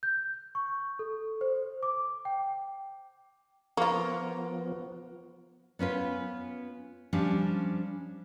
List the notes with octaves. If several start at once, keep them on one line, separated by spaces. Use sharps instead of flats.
G6
C#6
A4
C5
D6
G5
F3 A#3 B3 F4 A#4 C#6
B3 C#4 F4 B4
F3 G3 C#4 D4